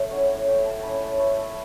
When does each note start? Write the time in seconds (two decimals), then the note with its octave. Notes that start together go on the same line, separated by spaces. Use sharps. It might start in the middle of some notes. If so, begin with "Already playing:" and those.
Already playing: A3 C#5
0.11 C#4 E4 F#5
0.48 A3 G5
0.65 A5
0.83 C#4 E4 B5
1.02 A5
1.20 A3 B4
1.38 A4